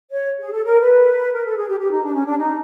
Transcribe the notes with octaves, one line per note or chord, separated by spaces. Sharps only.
C#5
G#4
A4
A#4
B4
A#4
A4
G#4
G4
G4
D#4
D4
C#4
D4
D#4